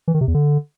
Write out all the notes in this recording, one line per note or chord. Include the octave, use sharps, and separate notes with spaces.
E3
D#3
C3
E2
D3